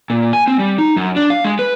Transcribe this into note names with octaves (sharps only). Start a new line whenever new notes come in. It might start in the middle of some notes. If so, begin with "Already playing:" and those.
A#2
G#5
C4
G3
D#4
F#2
D4
F5
G#3
B4